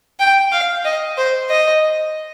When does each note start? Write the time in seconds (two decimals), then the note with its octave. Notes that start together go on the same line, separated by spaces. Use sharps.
0.19 G5
0.52 F5
0.85 D#5
1.17 C5
1.50 D#5